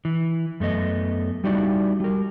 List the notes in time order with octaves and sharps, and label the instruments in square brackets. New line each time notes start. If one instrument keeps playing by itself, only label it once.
[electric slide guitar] E3
F#2 A3 B3 D#5
G3 D#4 E4 F#4 D5
G3 A#4